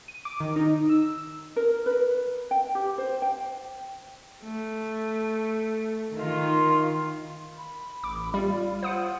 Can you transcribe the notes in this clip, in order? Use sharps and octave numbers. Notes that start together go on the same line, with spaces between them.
D#7
D6
D#3
D#4
E6
A#4
B4
G5
G4
C5
G5
A3
D#3 F4
B5
A1 D6
G3 F4
C5 F#5 D#6 C#7